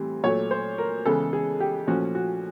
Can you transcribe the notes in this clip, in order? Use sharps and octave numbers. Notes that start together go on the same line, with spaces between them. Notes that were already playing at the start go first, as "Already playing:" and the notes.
Already playing: A2 E3 G3 C4
A#2 F#3 A3 C#5
C5
A#4
C#3 E3 G#3 B3 A4
G#4
G4
A#2 F3 A3 C#4 F#4
F#4